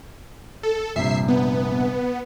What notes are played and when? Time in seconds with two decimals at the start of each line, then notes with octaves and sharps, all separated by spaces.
0.63 A4
0.96 A#1 G2 C3 E5 C7
1.28 B3